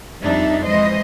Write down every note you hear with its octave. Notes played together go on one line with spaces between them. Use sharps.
F2 G3 D4 D#4 E5
E3 G#3 C5 D#5